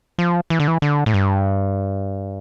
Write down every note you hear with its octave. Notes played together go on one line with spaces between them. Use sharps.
F3
E3
D3
E3
D3
A2
G2